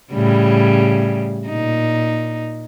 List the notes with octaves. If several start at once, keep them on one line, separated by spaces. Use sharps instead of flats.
A2 C#3 G3
A#2 D#4